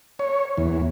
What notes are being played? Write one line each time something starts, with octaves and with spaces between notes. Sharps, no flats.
C#5
E2